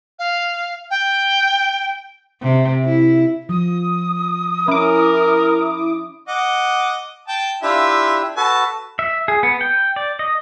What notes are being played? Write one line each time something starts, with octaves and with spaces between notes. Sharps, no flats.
F5
G5
C3
E4
F3 D#6
C#4 E4 A#4 D6
D#5 F#5 D6
G5 A5
D4 E4 F4 G4 E5 F5
F#4 A4 B4 A5
E5
G#4
B3
G5
D5
D#5